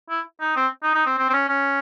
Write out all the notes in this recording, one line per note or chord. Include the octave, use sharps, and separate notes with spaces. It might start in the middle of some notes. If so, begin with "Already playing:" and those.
E4
D#4
C4
D#4
D#4
C4
C4
C4
C#4
C#4